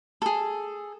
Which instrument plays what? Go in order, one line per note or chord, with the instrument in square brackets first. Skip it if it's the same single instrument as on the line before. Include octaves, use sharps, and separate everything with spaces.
[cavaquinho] G#4 A4